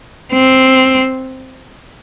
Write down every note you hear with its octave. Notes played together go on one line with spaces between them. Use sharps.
C4